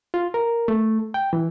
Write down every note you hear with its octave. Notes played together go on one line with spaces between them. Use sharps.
F4
A#4
A3
G5
E3